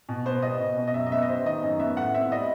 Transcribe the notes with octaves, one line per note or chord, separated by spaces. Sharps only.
B2
B3 C5
G3 D#5
B2
B2
D#5
F#2 E5
D#5
B3 E5
D#5
G3 C5
D#3 D#5
F#2
B3 E5
A2 F#5
C4 E5
G3 D#5